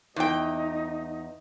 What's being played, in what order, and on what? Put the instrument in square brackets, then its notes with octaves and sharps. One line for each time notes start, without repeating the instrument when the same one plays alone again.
[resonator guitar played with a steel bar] E2 G5 [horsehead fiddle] D#4